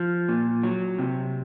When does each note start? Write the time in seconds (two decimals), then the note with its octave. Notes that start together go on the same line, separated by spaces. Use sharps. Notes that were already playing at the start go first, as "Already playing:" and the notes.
Already playing: F3
0.28 A#2
0.63 F#3
0.99 C3